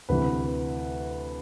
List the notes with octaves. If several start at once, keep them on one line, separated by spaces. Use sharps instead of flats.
D2 C3 E3 B4